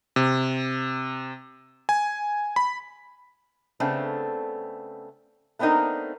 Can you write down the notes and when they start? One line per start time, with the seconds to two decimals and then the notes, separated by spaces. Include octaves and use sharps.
0.16 C3
1.89 G#5
2.56 B5
3.80 C#3 A3 B3 C4 D4
5.59 A3 B3 C4 D4 D#4 A#4